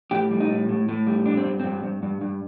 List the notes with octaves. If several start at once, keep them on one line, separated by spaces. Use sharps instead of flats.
A2 G4
G3
D#4
A2
A2
A2
G3
G2 D4
C4
G2
G2 C4
G2
G2
G2